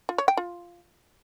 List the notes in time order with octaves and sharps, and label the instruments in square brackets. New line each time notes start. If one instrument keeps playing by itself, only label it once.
[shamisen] F4
C#5
G5
F4